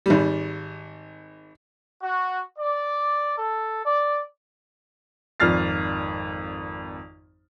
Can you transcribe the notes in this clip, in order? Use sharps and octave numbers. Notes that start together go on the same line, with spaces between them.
G#1 G3
F#4
D5
A4
D5
G#1 F2 D5 F6 A6 C7